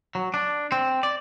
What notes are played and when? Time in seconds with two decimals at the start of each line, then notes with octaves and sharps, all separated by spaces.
0.15 F#3
0.34 D4
0.72 C4
1.03 D5